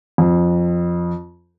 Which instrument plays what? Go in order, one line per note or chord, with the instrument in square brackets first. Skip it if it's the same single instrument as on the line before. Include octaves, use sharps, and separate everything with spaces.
[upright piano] F2